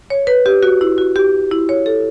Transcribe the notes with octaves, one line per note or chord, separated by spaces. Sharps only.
C#5
B4
G4
F#4
E4
F#4
G4
E4
C#5
A4